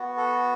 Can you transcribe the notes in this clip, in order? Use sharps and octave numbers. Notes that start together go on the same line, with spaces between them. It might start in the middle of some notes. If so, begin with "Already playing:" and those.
Already playing: B3 F#4
A4